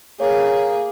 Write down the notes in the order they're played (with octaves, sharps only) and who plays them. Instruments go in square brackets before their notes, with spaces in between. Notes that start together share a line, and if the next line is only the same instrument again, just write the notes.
[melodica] A#3 [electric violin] G#4 [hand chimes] C#5